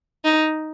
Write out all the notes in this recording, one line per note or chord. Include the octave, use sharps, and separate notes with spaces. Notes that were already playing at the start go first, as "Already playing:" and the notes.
D#4